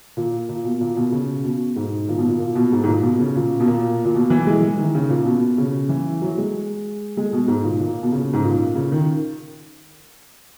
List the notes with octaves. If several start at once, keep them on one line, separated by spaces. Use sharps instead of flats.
A#2
A#2
B2
A#2
B2
C#3
B2
G#2
A#2
B2
A#2
A#2
B2
G#2
G#2
A#2
B2
C#3
A#2
B2
A#2
A#2
B2
E3
G#3
E3
D#3
C#3
A#2
B2
C#3
E3
F#3
G#3
G#3
B2
G#2
A#2
A#2
B2
C#3
G#2
A#2
C#3
D#3